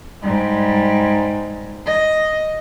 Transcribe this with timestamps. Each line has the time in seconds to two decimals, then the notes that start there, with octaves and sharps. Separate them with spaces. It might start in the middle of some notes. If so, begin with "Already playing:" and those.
0.23 G#2 G3
1.86 D#5